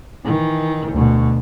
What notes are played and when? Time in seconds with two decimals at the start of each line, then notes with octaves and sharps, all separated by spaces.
0.25 D#3 E3
0.92 D2 B2